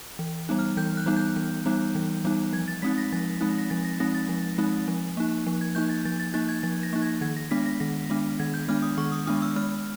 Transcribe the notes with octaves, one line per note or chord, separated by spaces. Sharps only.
E3
G3 B3 D#4
F6
E3 G6
F#6
G3 B3 D#4
G6
E3
G3 B3 D#4
E3
G3 B3 D#4
F3 G#6
A6
G#3 C4 D#4 B6
A#6
F3 A6
G#3 C4 D#4
A#6
F3 A6
A#6
G#3 C4 D#4 A#6
A6
F3
G#3 C4 D#4
F3
A#3 D#4
F3
G#6
A#3 D#4 G6
A6
F3 A6
A6
A#3 D#4 A6
G#6
F3 A6
A#6
A#3 D#4
G#6
D#3 G#6
A#6
G#3 B3 D4 B6
A#6
D#3 A#6
G#3 B3 D4
D#3 G#6
G6
G#3 B3 D4 F6
D#6
D#3 C#6
D#6
G#3 B3 D4 D#6
E6
G#3 F6